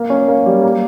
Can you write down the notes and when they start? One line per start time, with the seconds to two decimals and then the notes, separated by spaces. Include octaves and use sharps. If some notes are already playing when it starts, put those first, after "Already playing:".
Already playing: A#3
0.10 C#4
0.28 A#3
0.46 G3
0.63 A#3